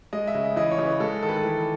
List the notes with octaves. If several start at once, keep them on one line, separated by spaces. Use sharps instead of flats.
G#3 D#5
E5
C#3
E3 D#5
C#5
C#3
B4
G#3 A4
D#3 A4
B4
A4
E3